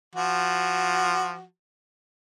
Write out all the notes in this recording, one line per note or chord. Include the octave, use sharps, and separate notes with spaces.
F3 F#4